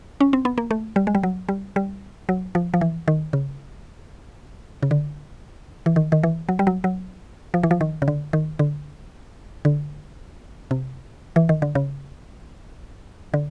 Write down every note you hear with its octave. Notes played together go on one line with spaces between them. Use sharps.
C#4
C4
B3
A#3
A3
G3
G#3
G3
F#3
G3
G3
F#3
F3
F3
E3
D#3
C#3
C#3
D3
E3
D#3
D#3
E3
F#3
G3
F#3
F#3
F3
E3
F3
D#3
C#3
D3
D#3
D3
D3
C3
E3
D#3
D3
C#3
D3